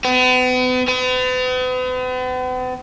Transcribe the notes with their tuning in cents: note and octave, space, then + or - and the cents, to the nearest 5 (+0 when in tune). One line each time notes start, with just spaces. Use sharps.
B3 +40
B3 +45